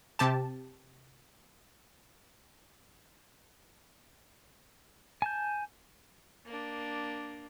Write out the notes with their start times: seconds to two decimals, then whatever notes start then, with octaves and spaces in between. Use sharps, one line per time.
0.19 C3 G4 A5
5.22 G#5 A5 G6
6.46 A#3 D4